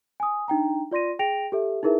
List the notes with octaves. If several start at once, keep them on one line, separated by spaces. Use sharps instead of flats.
G#5 D#6
D4 D#4 G5 A#5
F4 D5 C6 A#6 D#7
G#4 G5 A#6 D7 F7
G4 A4 E5
D#4 E4 G#4 A#4 B4 E5